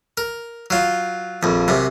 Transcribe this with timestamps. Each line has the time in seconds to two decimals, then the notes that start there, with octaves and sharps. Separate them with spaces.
0.18 A#4
0.70 F#3 F4
1.43 A#1 F2
1.68 F#2 C3